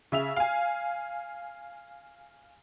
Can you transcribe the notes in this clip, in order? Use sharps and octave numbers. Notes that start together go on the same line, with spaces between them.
C#3 E5 F7
F5 G#5